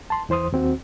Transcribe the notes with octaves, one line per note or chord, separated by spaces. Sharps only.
A5 C6
E2 E3 C5 C6 D#6
D#2 C4 F#4